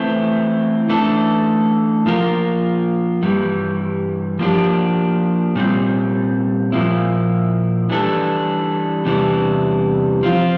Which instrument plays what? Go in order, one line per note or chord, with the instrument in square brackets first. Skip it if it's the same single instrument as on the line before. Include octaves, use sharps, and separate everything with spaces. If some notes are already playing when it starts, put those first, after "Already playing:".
Already playing: [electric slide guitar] E3 A3 C4
E3 A3 D4 A4
F3 A#3 F4 A#4
G2 E3 G3
F3 A#3 D4 G4
A#2 G3 C4
A#2 F3 A#3 E4
E3 G3 D4 A4
E2 C3 E3 G3 D4
F3 C4 F4